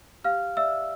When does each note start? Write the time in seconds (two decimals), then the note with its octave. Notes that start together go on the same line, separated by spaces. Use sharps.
0.24 G4 F5 F6
0.57 D5 E5 E6